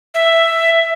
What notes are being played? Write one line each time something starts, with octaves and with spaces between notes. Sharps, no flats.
E5